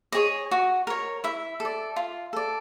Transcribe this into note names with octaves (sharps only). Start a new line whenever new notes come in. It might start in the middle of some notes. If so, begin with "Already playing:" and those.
G#4 C#5 D#5
F#4
A#4 C#5
E4 E5
A4 D5
F4
A4 D5